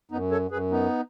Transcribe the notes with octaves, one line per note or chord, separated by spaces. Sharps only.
F#2 B3 D#4
A4 C#5
F#2 G#4 B4
B3 D#4